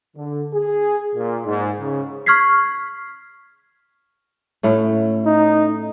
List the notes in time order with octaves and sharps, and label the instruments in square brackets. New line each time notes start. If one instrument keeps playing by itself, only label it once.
[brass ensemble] D3
G#4
A#2
G#2
C#3
[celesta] C#6 F6 G#6 B6 C7
[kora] A2 A3 C#4
[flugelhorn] D#4